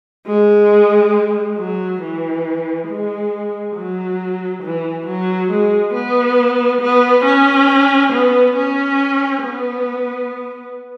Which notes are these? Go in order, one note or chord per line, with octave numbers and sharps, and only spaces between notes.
G#3
F#3
E3
G#3
F#3
E3
F#3
G#3
B3
B3
C#4
B3
C#4
B3